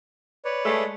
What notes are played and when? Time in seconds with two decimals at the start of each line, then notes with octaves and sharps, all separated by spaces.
0.45 B4 C#5 D5
0.65 G#3 A3